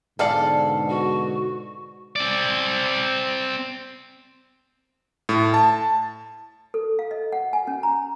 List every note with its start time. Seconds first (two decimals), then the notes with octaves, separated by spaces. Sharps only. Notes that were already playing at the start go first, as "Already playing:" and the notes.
0.19 G#2 B2 D3 A4 D5 F5 G#5
0.89 F#4
2.16 C4 D5
5.29 A2
5.54 A5
6.74 A4
6.99 F5
7.11 D#5
7.32 F#5
7.53 G#5
7.67 C#4
7.83 A#5